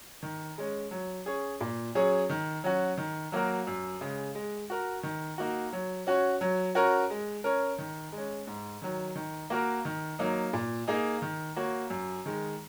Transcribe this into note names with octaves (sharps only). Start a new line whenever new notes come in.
D#3
G#3 C#4
F#3
C#4 G#4 C#5
A#2
F#3 C#4 G#4 C#5
D#3
F#3 C#4 F#4
D#3
F#3 A#3 F#4 A#4
F#2
C#3 G#3
G#3
F#4 A#4
D#3
A#3 D#4 F#4
F#3
C#4 F#4 C#5
F#3
C#4 F#4 A#4 C#5
G#3
C#4 A#4 C#5
D#3
G#3
C#4
G#2
D#3 F#3
D#3
A#3 F#4 A#4
D#3
F#3 A#3 D#4
A#2
A#3 D#4 G#4
D#3
A#3 F#4 C#5
F#2
D#3 G#3